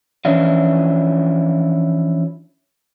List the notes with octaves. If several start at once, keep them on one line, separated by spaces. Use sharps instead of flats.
E3 F3 C#4 D4 E4 F4